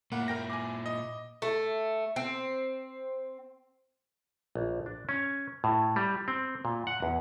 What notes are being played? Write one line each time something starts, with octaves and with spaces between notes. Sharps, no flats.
A#2 A#3 E4 F#5
A#4 G5 A#6
G#5 D6
D#5
A3
C4
A#1
D4
C#4
A2
G3
C4
A#2
F#5
E2